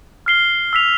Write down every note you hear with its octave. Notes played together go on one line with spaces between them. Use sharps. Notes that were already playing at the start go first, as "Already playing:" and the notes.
F6 C7 G7
E6 B6 F7